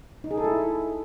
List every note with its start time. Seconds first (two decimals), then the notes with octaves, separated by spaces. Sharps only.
0.24 D#4
0.31 G#4
0.37 A4
0.44 E4